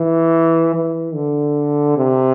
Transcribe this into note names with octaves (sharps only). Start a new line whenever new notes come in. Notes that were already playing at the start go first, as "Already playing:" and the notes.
Already playing: E3
E3
D3
C3